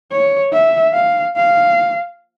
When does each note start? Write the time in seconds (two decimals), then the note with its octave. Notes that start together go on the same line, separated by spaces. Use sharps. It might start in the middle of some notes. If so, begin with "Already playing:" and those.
0.12 C#5
0.53 E5
0.94 F5
1.36 F5